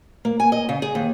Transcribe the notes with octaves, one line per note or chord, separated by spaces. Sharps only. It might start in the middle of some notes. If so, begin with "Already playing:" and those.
A#3
G#5
D#5
C#3
G#4
D#2